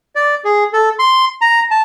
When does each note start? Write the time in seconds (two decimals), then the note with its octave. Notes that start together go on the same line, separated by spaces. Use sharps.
0.15 D5
0.45 G#4
0.73 A4
0.99 C6
1.41 A#5
1.71 A5